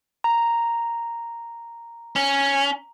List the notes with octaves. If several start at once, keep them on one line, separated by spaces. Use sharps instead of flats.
A#5
C#4